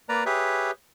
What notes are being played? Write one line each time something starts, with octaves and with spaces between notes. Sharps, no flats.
A#3 B4 D5 A#5
G4 G#4 B4 C#5 E5